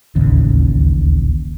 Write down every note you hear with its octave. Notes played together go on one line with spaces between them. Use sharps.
D1 A1 D#2 C#3